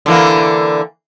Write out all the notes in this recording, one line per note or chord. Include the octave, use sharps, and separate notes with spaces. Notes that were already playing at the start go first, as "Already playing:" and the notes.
D3 E3 A#3